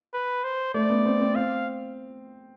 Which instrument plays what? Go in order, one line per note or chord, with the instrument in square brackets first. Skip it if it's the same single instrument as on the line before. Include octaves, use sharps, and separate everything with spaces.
[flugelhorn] B4
C5
[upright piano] A3 [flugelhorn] D5
[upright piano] B3
C4
C4
[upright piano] C4 [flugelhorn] F5